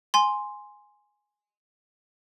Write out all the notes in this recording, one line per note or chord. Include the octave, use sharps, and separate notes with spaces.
G#5 C6